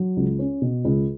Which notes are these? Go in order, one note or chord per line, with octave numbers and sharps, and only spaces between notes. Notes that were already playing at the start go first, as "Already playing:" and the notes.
Already playing: F#3
C#2
C#4
B2
C#2